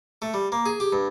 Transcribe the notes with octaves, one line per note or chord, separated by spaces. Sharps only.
A3
G3
A#3
G#4
G4
G2